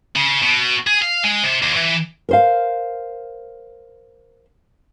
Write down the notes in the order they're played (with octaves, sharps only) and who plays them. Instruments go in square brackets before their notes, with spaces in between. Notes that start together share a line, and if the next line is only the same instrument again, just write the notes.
[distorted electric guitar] C#3
B2
G#4
F5
G#3
C3
D#2
E3
[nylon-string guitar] A#4 C5 F5